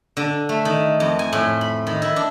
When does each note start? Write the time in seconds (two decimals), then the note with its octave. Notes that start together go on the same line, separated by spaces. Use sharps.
0.17 D3
0.49 A3
0.65 D#3
1.00 F2
1.19 G#5
1.33 A2
1.61 B5
1.87 D#3
2.02 E4
2.16 D4